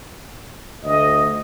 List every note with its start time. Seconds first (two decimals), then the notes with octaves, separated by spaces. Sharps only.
0.84 D2 D#5